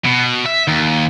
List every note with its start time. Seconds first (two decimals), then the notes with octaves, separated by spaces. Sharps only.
0.05 B2
0.46 E5
0.68 D#2